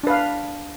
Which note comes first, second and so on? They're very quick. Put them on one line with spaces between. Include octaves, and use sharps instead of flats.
D4 B4 F5